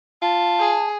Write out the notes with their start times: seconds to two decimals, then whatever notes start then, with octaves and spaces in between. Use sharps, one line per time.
0.22 F4 A5
0.59 G#4